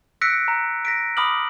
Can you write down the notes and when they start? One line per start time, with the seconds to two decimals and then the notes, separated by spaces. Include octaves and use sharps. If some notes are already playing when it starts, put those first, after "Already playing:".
0.21 E6 F#6 A#6 B6 C#7 D7
0.48 A#5
0.85 A#6 B6 D7
1.17 B5 D6 D#6 F6 F#7